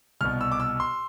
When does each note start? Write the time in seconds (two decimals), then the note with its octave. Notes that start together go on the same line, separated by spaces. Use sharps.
0.21 C2 B2 F6
0.41 E6
0.52 D6
0.60 E6
0.80 C6